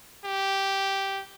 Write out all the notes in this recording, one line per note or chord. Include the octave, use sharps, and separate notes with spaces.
G4